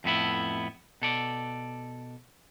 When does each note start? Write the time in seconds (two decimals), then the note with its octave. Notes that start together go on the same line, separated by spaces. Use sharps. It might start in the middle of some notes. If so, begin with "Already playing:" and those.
0.04 F2 A2 B3 E4
1.02 B2 A4 D5